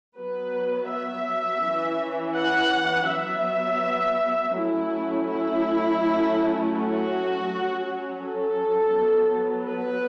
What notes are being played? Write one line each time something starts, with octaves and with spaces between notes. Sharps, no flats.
F#3 B3 B4
E5
E3 C#4
F#5
F#3 B3 E5
F#3 A3 C#4 E4
E4
F#3 A3 C#4
F#4
F#3 C#4
A4
F#3 B3
B4